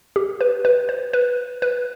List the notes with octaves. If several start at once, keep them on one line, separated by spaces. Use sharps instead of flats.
G4
B4
B4
C5
B4
B4